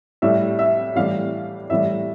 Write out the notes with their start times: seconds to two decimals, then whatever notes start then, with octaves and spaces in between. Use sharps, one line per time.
0.22 A2 G3 E5
0.59 E5
0.95 A2 E3 G3 F5
1.70 A2 E3 G3 E5